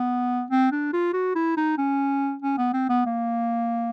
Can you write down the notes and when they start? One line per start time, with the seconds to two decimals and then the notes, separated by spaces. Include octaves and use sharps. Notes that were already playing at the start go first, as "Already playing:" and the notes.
Already playing: B3
0.50 C4
0.72 D4
0.93 F4
1.13 F#4
1.35 E4
1.57 D#4
1.78 C#4
2.42 C#4
2.58 B3
2.73 C4
2.89 B3
3.06 A#3